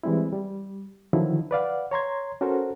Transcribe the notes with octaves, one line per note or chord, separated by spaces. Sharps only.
E3 G3 G#3 C4 E4
G3
D3 D#3 F3 F#3 E4
B4 D5 F5 F#5
C#5 A#5 C6 G#6
C#4 F#4 A4 A#4 C5